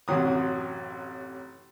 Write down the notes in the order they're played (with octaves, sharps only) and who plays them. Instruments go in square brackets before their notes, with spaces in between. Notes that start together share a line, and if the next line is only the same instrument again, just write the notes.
[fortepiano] A1 F#2 C3 F#3 D#6